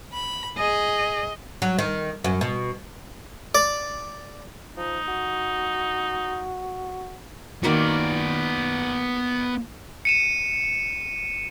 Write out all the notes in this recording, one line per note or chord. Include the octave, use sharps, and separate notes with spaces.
B5
G#4 D#5
F#3
D#3
F#2
B2
D5
F3 D#4
F#4
D#3 A#3 B3 F#4 D5
C#7 D#7 E7